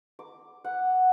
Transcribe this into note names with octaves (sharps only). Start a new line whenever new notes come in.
D6
F#5